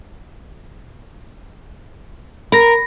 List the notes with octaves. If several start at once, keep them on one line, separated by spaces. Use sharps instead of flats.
A#4 B5 A#6